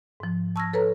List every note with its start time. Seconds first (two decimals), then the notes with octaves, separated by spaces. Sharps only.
0.20 G#2 F3
0.56 A5 C#6 E6 F6 G#6 A#6
0.73 A4 B4 C#5 A#5